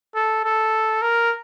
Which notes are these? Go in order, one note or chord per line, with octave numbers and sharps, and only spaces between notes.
A4
A4
A#4